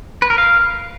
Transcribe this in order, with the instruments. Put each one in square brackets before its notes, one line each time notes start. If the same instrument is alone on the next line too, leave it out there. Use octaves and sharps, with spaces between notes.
[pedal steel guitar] B4
A#4
F5